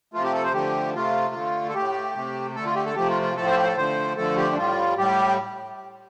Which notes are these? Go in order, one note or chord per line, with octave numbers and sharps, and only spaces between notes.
C3 F3 A3 F4
G4
A4
C5
D3 F3 A3 G4
C3 A3 F4
D3 A3
A4
A2 A3 G4
C3 A3
D3 A3 A4
F4
G4
A4
C3 F3 A3 G4
F4
F4
A2 F3 A3 A4
C5
A4
G4
C5
A4
D3 F3 A3 C5
D3 F3 A3 A4
G4
D4
A2 G3 F4
A2 G3 G4